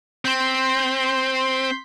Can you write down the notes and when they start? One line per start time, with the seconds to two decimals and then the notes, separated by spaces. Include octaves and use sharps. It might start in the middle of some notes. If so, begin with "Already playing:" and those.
0.25 C4 C6 G6 B6